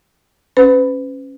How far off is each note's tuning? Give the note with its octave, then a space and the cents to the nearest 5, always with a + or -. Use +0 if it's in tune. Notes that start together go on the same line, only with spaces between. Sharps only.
C#4 -15 B4 +35